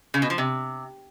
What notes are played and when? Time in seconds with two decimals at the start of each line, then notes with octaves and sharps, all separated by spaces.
0.14 C#3
0.22 B2
0.30 F3
0.38 C3